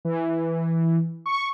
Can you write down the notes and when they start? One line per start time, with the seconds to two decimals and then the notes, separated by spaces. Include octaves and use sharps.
0.05 E3
1.26 C#6